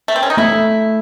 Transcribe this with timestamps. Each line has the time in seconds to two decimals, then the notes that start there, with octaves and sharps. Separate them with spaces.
0.08 A3
0.16 C4
0.23 C#4
0.30 D#4
0.37 A3 E4